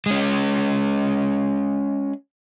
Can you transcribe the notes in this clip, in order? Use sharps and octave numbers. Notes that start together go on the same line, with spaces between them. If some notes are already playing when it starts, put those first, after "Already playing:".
G#3 C#4